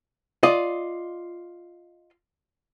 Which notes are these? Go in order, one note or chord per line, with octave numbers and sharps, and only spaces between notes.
F4 D5 D#5